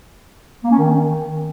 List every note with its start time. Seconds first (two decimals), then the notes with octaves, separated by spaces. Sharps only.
0.64 A#3
0.71 C#4
0.79 D#3